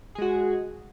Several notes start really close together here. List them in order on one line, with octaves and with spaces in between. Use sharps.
G#4 G#3 F#4